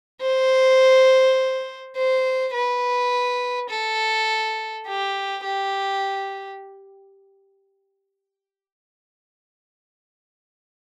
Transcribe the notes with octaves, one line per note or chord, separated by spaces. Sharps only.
C5
C5
B4
A4
G4
G4